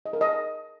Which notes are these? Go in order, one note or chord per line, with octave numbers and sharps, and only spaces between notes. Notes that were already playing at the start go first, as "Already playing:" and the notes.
D#5
A#4
D#5